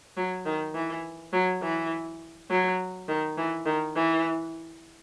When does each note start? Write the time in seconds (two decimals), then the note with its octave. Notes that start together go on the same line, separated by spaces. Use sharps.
0.17 F#3
0.46 D#3
0.75 E3
1.33 F#3
1.62 E3
2.50 F#3
3.08 D#3
3.37 E3
3.66 D#3
3.96 E3